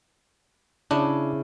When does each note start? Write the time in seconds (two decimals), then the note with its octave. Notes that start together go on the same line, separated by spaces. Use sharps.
0.91 C#3 D4 E4